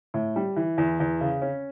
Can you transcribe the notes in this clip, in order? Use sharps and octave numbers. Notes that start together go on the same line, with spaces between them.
A2
G3
E3
E2
E2
C#3
C#4